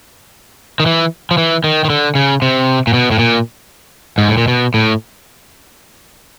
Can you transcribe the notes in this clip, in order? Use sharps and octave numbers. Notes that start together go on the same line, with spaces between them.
D#3
E3
F3
E3
D#3
D#3
D3
C#3
C3
A#2
B2
A2
A#2
G#2
A2
A#2
B2
A2